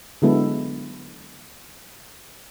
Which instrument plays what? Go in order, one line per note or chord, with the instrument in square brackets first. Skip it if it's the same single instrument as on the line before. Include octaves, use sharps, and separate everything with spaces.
[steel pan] D3 F#3 G#3 B3 E4 A4